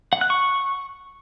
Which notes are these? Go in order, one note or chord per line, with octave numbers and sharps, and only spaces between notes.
F#5
F#6
C#6